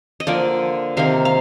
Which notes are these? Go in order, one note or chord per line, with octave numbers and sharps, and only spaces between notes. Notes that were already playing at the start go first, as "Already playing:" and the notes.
D#5
D3 F3 A#3 D5
C3 D#3 A#3 F5
F5